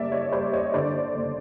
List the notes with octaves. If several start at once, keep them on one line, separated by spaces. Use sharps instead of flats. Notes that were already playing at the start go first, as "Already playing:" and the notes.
Already playing: F#1 G3 D5 E5
C#5 D#5
G3 C5 D5
C#5 D#5
D3 C5 D5
F#1